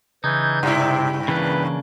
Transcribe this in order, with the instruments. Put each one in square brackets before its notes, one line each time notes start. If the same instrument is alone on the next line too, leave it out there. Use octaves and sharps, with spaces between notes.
[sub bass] C#3 [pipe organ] E3 G6 G#6 [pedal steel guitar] D#4
[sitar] G2 E4 [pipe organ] C3
[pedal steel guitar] C#3 A#3 D4 [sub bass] E3 [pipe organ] B4